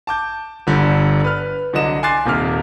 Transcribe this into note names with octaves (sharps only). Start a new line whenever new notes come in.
A5 D6 G6
G1 D3 G3
B4 F6
C2 D3 F#3 D#5 E7
G#5 C6 D6 F#6 A6 C7
D#1 D#2 C3 D6 F6